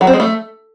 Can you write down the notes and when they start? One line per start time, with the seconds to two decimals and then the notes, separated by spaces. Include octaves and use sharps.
0.01 F#3
0.07 C4
0.13 G#3
0.20 A3